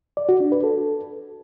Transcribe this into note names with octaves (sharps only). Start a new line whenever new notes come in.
D5
F#4
D4
B4
A4